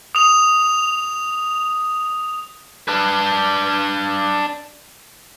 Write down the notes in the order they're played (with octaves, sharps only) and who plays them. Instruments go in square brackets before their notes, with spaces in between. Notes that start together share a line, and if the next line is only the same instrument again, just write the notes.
[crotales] D#6 F7
[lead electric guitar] D4 B4